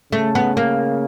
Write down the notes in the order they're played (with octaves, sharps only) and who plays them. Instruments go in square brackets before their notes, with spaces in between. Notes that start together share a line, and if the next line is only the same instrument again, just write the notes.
[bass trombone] C#3 [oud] A3
[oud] B3
A#3